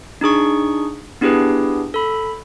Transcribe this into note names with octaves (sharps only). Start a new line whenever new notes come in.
D4 D#4 G#4 C#6
B3 D4 E4 G4 G#4 B4
A4 B5